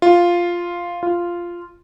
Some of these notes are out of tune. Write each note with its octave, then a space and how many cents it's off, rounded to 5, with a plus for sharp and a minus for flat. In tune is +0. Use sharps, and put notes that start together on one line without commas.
F4 +0
F4 -5